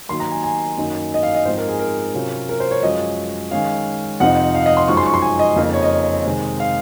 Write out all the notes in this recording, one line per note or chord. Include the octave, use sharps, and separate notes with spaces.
D#3 F#3 A#3 C6
A#5
G#5
G#5
F#2 D#3 A#3 D#4
D#5
F5
D#5
G#2 F3 C4 D#4 C5
A#4
G#4
A#4
C3 F#3 C#4 F4
A#4
C5
C#5
F#2 F3 G#3 C#4 D#5
D#3 G#3 C#4 F5
F2 C3 F3 C4 D#4 F#5
F5
D#5
C6
F#2 F3 G#3 D#4 C#6
C6
C#6
C6
G#5
D#5
F2 C#3 F3 A#3 D#4
C#5
D#5
C3 D#3 G#3 C4
F5